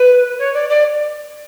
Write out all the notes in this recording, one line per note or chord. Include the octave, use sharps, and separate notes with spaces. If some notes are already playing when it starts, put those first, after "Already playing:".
Already playing: B4
C#5
D5
D5